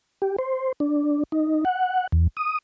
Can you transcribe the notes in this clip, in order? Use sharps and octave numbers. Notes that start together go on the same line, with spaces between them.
G4
C5
D4
D#4
F#5
E2
D#6